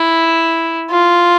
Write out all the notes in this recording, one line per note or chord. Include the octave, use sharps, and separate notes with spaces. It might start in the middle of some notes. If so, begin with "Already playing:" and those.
Already playing: E4
F4